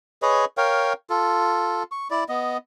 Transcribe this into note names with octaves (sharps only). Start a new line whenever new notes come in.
G#4 B4 C#5 D#5
A#4 C#5 F5 G5
F4 A4
C#6
E4 D5
B3 D#5